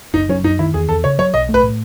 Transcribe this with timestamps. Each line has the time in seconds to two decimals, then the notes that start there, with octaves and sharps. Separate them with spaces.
0.14 F#1 D#4
0.29 F#3 C#4
0.44 F#2 D#4
0.59 D#3 E4
0.74 E2 G#4
0.89 E2 A4
1.04 C#3 C#5
1.19 F#3 C#5
1.34 B1 D#5
1.49 A3
1.54 B4
1.63 A2